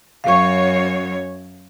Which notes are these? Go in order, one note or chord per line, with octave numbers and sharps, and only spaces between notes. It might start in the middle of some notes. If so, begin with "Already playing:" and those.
F#2 C#5 F5 C#6